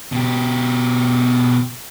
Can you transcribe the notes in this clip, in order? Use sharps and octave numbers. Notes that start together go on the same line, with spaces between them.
B2 G4